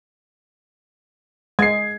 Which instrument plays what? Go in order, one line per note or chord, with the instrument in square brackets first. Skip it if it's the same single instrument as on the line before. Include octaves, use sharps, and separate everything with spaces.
[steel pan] G#3 [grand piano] G#6 C7